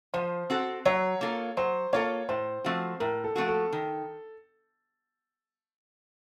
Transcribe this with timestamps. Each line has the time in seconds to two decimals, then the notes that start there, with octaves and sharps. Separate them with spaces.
0.14 F3 C5
0.50 C4 F#4 A4
0.85 F#3 C#5
1.21 A#3 F4 A4
1.57 F#3 C5
1.93 A#3 F4 A4 C#5
2.29 A2 C5
2.64 F3 A3 C4 F#4
3.00 A2 A#4
3.24 A4
3.36 F3 A3 C4 F#4
3.48 A4
3.72 D#3